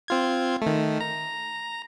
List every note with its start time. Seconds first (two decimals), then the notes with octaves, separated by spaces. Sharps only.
0.08 C4 F4 G#6
0.62 D#3 A3
1.01 A#5